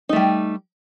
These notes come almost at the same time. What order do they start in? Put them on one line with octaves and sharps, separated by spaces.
D#4 A3 G3